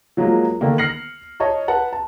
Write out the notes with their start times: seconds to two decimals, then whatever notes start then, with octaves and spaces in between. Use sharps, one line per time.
0.17 F3 F#3 G#3 A#3
0.61 D3 D#3 A#3
0.78 F6 A#6 C7 C#7 F#7
1.40 C#5 D#5 A5 C#6
1.68 B4 F#5 A5
1.93 A5